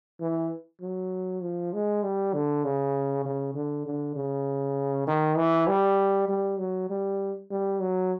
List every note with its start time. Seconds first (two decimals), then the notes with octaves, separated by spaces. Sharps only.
0.20 E3
0.81 F#3
1.42 F3
1.73 G#3
2.03 G3
2.34 D3
2.64 C#3
3.25 C#3
3.55 D3
3.86 D3
4.16 C#3
5.07 D#3
5.37 E3
5.68 G3
6.29 G3
6.58 F#3
6.90 G3
7.51 G3
7.81 F#3